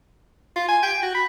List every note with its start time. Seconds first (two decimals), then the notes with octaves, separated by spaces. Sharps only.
0.56 F4
0.68 G#5
0.83 G5
1.02 F#4
1.14 B5